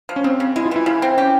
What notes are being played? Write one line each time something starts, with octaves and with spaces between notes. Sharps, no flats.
F3
C#4
C#3 C4
C#3
G#3 E4
F4
E3 E4
C#3 E4
C4
C#4 G4